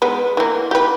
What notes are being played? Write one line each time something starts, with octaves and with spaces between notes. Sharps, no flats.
G#3 B3
E3 A#3
G4 B4